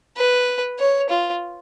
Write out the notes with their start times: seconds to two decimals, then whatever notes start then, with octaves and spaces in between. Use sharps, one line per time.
0.17 B4
0.79 C#5
1.10 F4